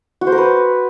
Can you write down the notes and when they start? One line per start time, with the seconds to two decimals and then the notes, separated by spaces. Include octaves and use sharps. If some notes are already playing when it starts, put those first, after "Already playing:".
0.21 F#4
0.27 C5
0.32 A#4
0.38 B4